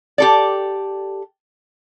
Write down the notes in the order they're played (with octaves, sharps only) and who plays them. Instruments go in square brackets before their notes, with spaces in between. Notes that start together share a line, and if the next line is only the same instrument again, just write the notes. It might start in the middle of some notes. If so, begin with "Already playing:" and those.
[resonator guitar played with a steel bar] G4 A4 D5